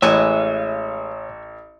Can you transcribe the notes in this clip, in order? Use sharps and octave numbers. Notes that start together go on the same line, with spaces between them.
A1 G#3 B4 C#5 E5 G#5